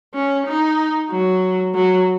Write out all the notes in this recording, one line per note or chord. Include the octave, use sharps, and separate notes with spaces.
C#4
D#4
F#3
F#3